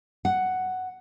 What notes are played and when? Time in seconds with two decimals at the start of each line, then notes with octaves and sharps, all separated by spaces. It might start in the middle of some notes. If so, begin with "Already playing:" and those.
0.25 F#5